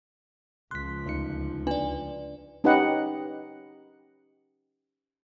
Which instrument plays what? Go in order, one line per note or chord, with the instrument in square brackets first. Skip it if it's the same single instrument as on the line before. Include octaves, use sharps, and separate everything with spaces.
[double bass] C#2 F3 [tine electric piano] C6 B6 [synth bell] F#6
[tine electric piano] D2 D#4 C#7
[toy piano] D4 [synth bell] B4 D5
[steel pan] C#4 D#4 G4 B4 D#5 F#5